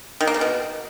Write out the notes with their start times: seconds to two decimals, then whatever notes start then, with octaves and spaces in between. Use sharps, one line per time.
0.21 D#3
0.27 A#3
0.34 C#3
0.41 B2